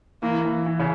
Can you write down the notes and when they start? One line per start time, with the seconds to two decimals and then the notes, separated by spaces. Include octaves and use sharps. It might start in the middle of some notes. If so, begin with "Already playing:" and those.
0.22 E3 A#3
0.45 E3
0.66 E3
0.79 C#3